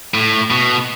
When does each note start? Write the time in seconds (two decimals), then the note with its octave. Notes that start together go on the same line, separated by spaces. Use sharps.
0.14 A2
0.50 B2